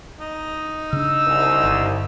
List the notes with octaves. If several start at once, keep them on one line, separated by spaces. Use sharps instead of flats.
D#4
C#3 D4 E6
C2
G1